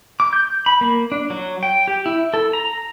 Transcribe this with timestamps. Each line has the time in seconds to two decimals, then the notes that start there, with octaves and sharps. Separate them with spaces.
0.20 D6
0.33 G6
0.66 B5
0.81 A#3
1.12 D4
1.30 F#3
1.63 G5
1.88 G4
2.06 E4
2.34 A4
2.53 A#5